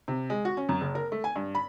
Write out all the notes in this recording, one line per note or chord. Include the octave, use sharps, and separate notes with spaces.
C3
G#3
F#4
C#4
F#2
F#1
A#4
A3
G#5
G2
B5